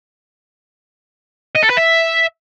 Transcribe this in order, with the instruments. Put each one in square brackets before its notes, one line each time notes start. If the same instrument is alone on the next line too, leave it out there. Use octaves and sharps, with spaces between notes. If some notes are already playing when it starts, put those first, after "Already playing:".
[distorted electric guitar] D#5
A4
B4
E5